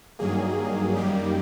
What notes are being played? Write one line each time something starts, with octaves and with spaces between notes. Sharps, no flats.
G2 D#3 F#3 A#3 G#4
F#2 D#3 G3 A#3 G4